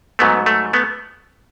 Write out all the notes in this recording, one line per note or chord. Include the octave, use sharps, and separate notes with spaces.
G#2 F#3 A3 B3
A3
A3 B3